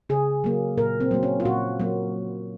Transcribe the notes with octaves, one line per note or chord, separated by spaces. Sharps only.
C#3 G#4
F#3 A#3
A#2 A#4
C4
F#3 A#3
C#4
F4
A#2 F#4
F#3 A#3